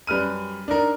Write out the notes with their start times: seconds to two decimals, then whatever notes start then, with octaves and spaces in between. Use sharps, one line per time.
0.07 F#2 G3 B4 F6 D#7
0.68 D4 D#4 A#4